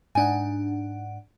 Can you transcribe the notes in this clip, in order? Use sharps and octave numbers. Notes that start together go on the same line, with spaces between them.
G#2 D4 D#4 F#5 G#5